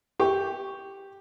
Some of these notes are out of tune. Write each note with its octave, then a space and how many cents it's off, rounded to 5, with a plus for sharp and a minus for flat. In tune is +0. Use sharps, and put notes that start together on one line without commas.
G4 +0 C#6 +0